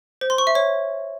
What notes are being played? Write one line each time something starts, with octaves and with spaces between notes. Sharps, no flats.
C5
C6
C#6
E5
C#5